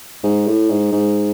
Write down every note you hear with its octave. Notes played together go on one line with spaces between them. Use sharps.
G#2
A2
G#2
G#2